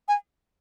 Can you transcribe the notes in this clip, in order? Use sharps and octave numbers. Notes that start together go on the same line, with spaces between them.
G#5